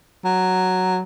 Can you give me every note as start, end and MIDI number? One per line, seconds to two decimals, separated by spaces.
0.25 1.03 54